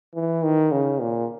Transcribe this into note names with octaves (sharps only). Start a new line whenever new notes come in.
E3
D#3
C#3
A#2